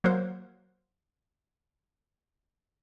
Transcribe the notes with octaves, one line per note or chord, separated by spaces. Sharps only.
F#3 A#3 F#4 C5